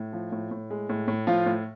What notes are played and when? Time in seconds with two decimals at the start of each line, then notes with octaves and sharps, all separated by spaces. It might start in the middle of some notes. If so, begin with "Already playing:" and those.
Already playing: A2
0.13 F3
0.32 A2
0.51 A2
0.70 G#3
0.89 A2
1.08 A2
1.27 A2 F3 F4
1.46 A2